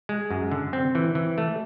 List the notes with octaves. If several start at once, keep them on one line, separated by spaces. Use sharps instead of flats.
G#3
F#2
D3
C4
E3
E3
A3